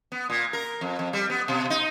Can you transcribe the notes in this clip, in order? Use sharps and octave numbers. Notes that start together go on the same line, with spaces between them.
B3
A#2
A#4
F2
F2
G3
B3
B2
D#4